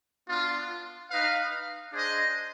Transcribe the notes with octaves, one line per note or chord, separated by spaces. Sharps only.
B3 D4 F4
D#4 B4 F5
D4 G#4 C5 D#5